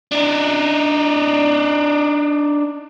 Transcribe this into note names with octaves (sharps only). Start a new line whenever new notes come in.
D4 D#4